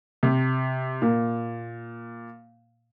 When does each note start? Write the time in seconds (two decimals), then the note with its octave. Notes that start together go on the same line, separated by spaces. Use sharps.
0.23 C3
1.02 A#2